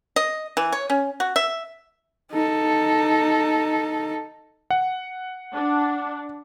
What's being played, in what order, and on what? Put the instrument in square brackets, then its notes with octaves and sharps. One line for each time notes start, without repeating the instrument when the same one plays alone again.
[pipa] D#5
E3
C#5
C#4
F#4
E5
[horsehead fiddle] D#4 A4
[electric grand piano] F#5
[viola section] D4